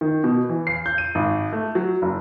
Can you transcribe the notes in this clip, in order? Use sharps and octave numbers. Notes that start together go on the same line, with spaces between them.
D#3
B2
E3
C7
G6
D#7
G#1
A3
F#3
F#1